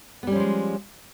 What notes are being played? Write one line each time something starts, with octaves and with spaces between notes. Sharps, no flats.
F3 G3 G#3 B3 C#4